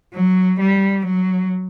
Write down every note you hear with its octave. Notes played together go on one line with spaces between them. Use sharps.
F#3
G3
F#3